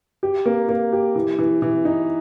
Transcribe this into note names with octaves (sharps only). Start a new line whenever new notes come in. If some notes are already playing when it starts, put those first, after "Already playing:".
G4
A#3
A#3
G4
E3
E3
E3
D#4